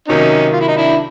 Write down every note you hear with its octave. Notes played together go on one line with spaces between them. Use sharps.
C3 D#3 F#3 A#3 C#4 D#4
F4
E4
D#4
D4 E4